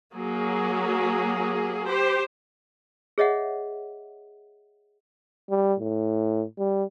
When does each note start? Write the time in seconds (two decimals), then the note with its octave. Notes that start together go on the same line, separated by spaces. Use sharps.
0.14 F#3 A#3 G#4
1.87 G4 C5
3.18 G#4 C#5 D#5 E5 F#5
5.50 G3
5.80 A2
6.58 G3